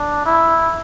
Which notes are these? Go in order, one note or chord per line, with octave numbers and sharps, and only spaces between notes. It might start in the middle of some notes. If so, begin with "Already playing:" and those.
Already playing: D4
E4